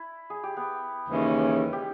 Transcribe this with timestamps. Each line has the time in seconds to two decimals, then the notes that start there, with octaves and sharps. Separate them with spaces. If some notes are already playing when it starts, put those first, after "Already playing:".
Already playing: E4
0.30 G#4
0.43 G4
0.57 B3
1.08 D#2 C#3 E3 G#3 C#4
1.73 G4